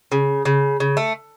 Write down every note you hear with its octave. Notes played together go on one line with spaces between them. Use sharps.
C#3
C#3
C#3
A3